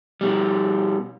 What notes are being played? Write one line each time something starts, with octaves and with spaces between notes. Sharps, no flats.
B2 G3